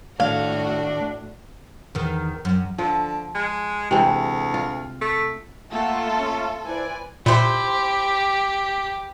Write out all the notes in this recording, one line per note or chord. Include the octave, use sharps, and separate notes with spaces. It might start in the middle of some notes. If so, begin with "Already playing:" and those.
A2 D#3 A3 D4 F#4 C#5 F5
E2 D#3
F#2
D3 F3
G#3
D2 C3 E3 G#3
F4
A3
A3 A#3 F4 A4 E5 F#5
C#4
E4 B4 C5 D5 G#5
A#2 E4 G4 C5